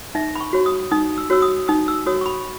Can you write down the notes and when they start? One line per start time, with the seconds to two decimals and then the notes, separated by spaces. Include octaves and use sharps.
0.15 D#4 E5
0.36 B5
0.41 C#6
0.53 F#4 C#5
0.66 D#6
0.91 D#4 D#6
1.18 E6
1.30 F#4 C#5 E6
1.42 D#6
1.68 D#4 D#6
1.88 E6
2.06 F#4 C#5 D#6
2.21 C#6
2.26 B5